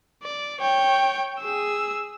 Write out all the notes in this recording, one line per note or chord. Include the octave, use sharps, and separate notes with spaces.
D5
C#5 G5
G#4 E6